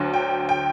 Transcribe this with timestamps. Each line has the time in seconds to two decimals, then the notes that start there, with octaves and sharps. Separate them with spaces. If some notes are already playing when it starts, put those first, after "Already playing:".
Already playing: D2 D3 F#3
0.14 G5
0.49 G5